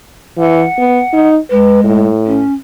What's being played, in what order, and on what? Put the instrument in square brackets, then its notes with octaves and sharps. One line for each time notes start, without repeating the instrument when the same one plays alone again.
[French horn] E3 [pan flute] F#5
[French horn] B3
D#4
[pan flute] G#3 [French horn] B4
[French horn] A2
[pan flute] C#4